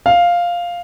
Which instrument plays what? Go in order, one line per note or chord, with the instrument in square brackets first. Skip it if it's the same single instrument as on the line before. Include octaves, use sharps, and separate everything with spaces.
[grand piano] F5